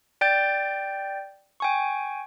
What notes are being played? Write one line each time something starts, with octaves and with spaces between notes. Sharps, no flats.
D5 G5 G6 A6
G5 G#5 C#6